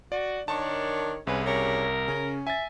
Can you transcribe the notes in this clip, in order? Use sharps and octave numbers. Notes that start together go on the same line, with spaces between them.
F#4 D5
D#3 D4 C#5 A5
C2 G#3 C#4 B4
C#3 G4 A#4 C#5
C#3 C#4
E5 G#5 A6